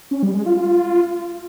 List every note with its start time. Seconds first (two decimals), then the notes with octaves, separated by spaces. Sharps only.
0.11 C#4
0.23 G3
0.34 G#3
0.46 F4
0.57 F4